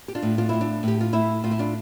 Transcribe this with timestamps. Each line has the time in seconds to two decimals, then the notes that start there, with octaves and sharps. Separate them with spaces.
0.08 G4
0.15 D4 F4
0.22 A2
0.38 D4 F4
0.49 A2 E4
0.61 D4
0.83 A2 G4
1.01 F4
1.13 A2 E4
1.44 A2 F4
1.51 E4
1.59 D4 F4